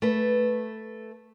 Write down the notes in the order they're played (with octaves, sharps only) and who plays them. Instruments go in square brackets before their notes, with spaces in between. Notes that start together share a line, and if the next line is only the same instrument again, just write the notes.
[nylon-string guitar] A3 B4